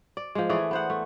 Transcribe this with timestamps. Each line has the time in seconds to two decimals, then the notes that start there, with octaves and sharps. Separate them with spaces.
0.17 D5
0.35 F3 G#3
0.49 E3 A3 G#4 D5
0.71 B3 C5 F#5
0.90 A3